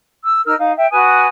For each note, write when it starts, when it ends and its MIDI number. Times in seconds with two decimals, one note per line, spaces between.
0.23 0.41 88
0.46 0.54 63
0.46 0.54 70
0.46 0.54 88
0.46 0.54 89
0.59 0.72 63
0.59 0.72 77
0.77 0.87 76
0.77 0.87 79
0.91 1.26 66
0.91 1.26 71
0.91 1.26 80
0.91 1.26 87